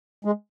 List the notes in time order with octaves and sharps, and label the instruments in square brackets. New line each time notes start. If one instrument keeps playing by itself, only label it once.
[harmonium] G#3